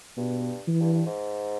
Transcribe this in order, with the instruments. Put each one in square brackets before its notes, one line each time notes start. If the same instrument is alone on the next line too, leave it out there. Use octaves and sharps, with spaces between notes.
[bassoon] G2 [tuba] B2
[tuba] E3
[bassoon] G2
G2
G#2